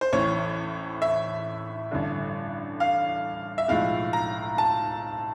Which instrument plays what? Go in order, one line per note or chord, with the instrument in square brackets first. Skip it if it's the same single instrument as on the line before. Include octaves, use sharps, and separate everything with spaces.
[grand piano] C5
A1 A2 E3 C#5
E5
A1 G2 D3
F5
E5
B1 A2 F3 G#3 F5
A#5
A5